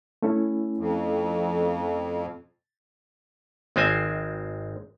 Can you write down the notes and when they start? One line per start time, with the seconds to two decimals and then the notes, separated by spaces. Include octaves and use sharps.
0.22 A3 C#4 E4
0.77 F2
3.76 G#1 G#3 C4 F4 C5 G#5